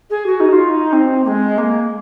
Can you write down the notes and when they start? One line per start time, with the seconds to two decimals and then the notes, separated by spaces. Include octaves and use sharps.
0.10 G#4
0.26 F#4
0.40 D#4
0.48 F#4
0.52 F4
0.69 D#4
0.92 C4
1.24 A#3
1.27 G#3
1.57 A#3